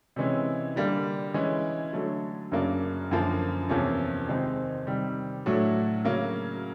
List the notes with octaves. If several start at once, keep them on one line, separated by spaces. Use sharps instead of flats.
C3 E3 G#3 C#4
D3 G3 A#3
E3 G#3 C#4
D3 F#3 A3
F#2 C#3 F#3 A#3 D4
F#2 D3 F3 A#3
E2 C3 F3 A#3 C#4
C3 D#3 G#3 C4 D#4
C3 D#3 G3
A2 F#3 A3 D4 F#4
C#3 F#3 A#3 C#4